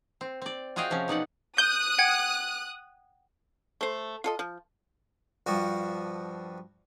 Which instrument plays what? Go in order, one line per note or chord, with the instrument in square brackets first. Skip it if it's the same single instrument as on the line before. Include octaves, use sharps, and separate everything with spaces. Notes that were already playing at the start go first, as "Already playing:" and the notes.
[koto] C4
C4 D5
F4 F#4 G#4 D#5 F5 G5
C3 F3 C4 C#4
B2 D#4 D5 F#5
[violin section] D#6 F#6 [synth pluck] G6
[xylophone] F#5 G5 G#6
[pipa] A3 C5
F4 A4 D#5
F3
[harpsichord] G2 F3 F#4